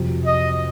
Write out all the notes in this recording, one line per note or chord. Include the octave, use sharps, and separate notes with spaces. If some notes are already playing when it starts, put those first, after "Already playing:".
Already playing: F2 C3 F#3
D#5